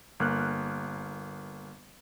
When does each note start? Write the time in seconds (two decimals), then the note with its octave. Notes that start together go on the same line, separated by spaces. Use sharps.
0.20 G1 A#3 F6 F#6